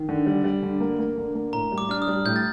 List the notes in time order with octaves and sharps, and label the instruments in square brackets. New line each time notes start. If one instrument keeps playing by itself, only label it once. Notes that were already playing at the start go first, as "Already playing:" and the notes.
Already playing: [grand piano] D#3
D3
G3
G3
D3
A#3
A#3
D3
A#3
[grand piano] A2 [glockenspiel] A#5
[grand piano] G3
[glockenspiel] D6
[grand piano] D4 [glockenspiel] F6
[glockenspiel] D#6
[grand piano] G3
[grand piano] A2 [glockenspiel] G6
[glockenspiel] A6